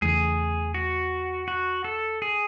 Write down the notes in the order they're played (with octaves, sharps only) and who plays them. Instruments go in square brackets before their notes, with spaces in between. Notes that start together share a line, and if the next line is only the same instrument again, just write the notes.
[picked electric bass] E2 C#3 E3 A3 [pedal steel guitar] G#4
[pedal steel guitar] F#4
F#4
A4
G#4